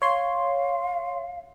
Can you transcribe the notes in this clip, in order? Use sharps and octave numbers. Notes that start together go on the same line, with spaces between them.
C#5 F5 C6